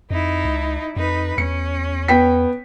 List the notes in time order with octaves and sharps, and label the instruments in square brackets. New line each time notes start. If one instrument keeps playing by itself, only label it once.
[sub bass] F2 [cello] D#4 E4
[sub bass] C#2
[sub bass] F2 [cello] D#4 B4
[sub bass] E2 [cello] C#4 [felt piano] C#7
[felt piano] B3 G5 B6